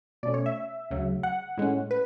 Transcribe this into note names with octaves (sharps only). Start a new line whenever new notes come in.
B2 A3 C#4 D5
C#5
E5
D2 C#3 F#3
F#5
A2 G#3 C#4
B4